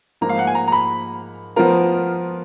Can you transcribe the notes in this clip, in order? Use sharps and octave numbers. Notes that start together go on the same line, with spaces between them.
G#2 F3 A#3 A#5
F5
F#5
G#5
A#5
A#5
B5
F3 B3 F4 A#4 A#5